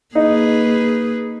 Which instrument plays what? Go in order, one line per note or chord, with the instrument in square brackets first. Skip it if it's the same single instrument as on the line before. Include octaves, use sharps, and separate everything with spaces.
[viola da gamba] A#3 G#4 B4 [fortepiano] D#4